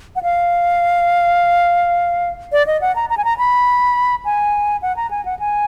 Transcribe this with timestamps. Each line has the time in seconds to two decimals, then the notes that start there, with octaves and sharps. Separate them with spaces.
0.16 F#5
0.23 F5
2.52 D5
2.67 D#5
2.81 F#5
2.96 A#5
3.10 A#5
3.18 G#5
3.25 A#5
3.38 B5
4.25 G#5
4.82 F#5
4.97 A#5
5.11 G#5
5.25 F#5
5.39 G#5